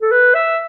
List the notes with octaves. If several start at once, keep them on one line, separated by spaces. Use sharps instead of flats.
A4
B4
E5